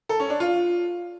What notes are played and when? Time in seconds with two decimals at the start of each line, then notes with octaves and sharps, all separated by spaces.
0.09 A4
0.20 C#4
0.30 D4
0.40 F4